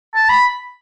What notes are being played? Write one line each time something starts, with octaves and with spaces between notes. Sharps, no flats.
A5
B5